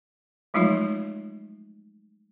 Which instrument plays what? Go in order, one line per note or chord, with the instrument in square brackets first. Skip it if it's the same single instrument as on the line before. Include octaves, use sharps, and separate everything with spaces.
[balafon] F3 F#3 G#3 A3 D#4 F4